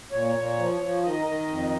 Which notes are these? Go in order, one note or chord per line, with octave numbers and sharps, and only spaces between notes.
A#2 C#5
A#2
F3
F3
D#3 D#5
D#3
F2